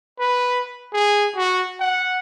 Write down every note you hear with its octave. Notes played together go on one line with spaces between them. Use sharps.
B4
G#4
F#4
F#5